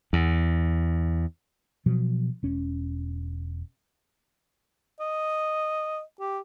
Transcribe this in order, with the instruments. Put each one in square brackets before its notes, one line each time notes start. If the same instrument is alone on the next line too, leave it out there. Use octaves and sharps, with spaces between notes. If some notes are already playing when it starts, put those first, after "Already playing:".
[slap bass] E2
[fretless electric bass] B2 F3 F#3
E1 C#4
[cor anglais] D#5
G4